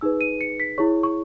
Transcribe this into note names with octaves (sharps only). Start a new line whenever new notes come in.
D#4 G#4 B4 E6
D#7
C#7
B6
E4 G#4 C#5 C#6
C#6